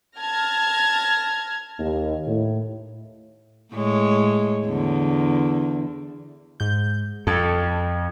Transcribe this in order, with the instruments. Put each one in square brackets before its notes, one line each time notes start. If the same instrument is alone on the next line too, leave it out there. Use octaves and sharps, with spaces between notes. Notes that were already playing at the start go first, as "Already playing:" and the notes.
[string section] A5 F6 G#6 A#6
[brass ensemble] D#2
A2
[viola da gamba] A2 G#3 C#5
E2 D3
[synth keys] G#2 G6
[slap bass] F2 [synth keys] A4